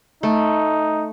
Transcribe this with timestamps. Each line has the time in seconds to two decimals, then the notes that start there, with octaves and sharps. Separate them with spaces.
0.23 A3 D#4